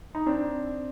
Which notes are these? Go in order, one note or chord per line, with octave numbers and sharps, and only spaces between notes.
D#4
C4 D4